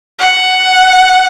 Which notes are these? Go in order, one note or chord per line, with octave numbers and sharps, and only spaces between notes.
F#5